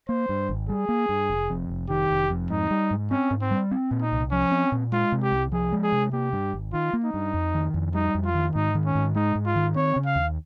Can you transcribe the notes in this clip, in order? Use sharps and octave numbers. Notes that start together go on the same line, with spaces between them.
A#3 C5
G2
G#1
G3 G#4
A#3
G2
F1
F2
F1
D#3 G4
F1
F2
G#2 D#4
G3
G#2
C4 C#4
G#2
C4
G3
C4
A#2
D#4
C2
F3 C#4
C4
A#2
G#3 F4
C3
G4
C2
F3 G#4
G#3
G#4
C3
A#3 G4
G2
G#1
D#3 F4
A#3
D#4
G2
F2
D#3
F2
G3 D#4
F2
F4
D#3
G#2 D#4
D#3
C#4
G#2
G#3 D#4
G#2
F4
D#3
C4 C#5
C#3
F5
D#2